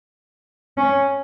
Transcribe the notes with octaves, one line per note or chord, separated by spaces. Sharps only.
C#4